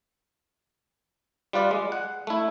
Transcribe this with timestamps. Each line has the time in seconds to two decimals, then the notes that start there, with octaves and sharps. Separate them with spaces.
1.53 G3 F4 B4 D5
1.71 G#3
1.92 F#5
2.27 A3 E4